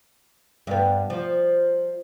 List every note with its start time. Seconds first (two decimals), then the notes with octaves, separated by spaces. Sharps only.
0.67 G2 B3
1.10 F3